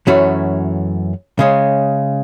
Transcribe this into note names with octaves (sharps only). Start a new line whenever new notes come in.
F#2 E3 A3 C#4 F#4
C#3 G#3 C#4